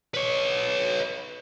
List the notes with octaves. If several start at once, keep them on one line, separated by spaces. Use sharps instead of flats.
B4 C#5